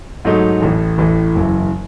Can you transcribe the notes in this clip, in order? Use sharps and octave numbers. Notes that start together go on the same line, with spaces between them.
G#2 F#3 A3 D#4
A1 A2 E3
A1 A2 E3
F#1 F#2 E3